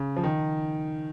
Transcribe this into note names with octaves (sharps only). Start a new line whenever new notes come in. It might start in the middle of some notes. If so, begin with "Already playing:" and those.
Already playing: C#3
F3
D#3